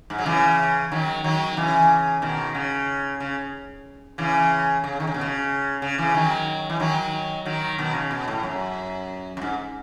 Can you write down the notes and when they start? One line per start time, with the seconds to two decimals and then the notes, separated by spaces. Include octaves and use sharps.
0.10 G#2
0.18 F#3
0.26 C#3 E3
0.92 D#3 F#3
1.24 D#3 F#3
1.57 C#3 E3
2.22 B2 D#3
2.55 C#3
3.20 C#3
4.18 C#3 E3
4.84 C#3
5.00 D#3
5.07 C#3
5.14 B2
5.21 C#3
5.82 C#3
5.98 C#3 E3
6.14 D#3 F#3
6.70 E3
6.80 D#3 F#3
7.45 D#3 F#3
7.78 B2 D#3
7.95 C#3
8.11 B2
8.28 A2
8.43 F#2
9.37 F#2
9.42 G#2